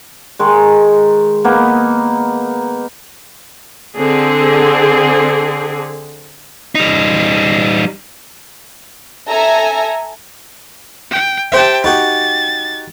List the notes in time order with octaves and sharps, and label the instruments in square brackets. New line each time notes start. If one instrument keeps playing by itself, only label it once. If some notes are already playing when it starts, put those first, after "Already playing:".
[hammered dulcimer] D#3 G#3
A#3 B3 D#4
[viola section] D3 C4 G#4
[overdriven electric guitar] G3 D#4
[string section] A4 E5 G#5 A#5
[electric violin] G5
[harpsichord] G4 C5 E5 [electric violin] G5 A5
[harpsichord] D#4 F#4 G4 [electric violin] A6